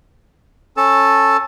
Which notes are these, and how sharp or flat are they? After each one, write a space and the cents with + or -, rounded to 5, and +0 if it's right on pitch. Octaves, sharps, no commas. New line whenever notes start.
C#4 -15 A4 +0 A5 +0